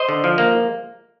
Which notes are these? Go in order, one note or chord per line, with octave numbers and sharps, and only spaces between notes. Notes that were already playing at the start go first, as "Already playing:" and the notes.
Already playing: C5 D#5
D3
F3
A#3